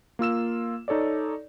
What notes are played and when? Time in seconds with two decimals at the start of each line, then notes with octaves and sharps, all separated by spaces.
0.19 A#3 F4 E6 E7
0.88 D#4 A4 C#5 D5